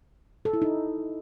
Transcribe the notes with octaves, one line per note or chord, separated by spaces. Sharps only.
A4
E4
D#4